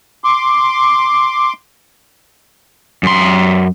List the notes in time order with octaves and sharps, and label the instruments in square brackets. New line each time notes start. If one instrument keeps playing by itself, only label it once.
[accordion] C6 D6
[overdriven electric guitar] F#2 C6